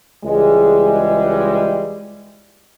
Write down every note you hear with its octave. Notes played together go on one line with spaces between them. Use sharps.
C#2 E3 G3 G#3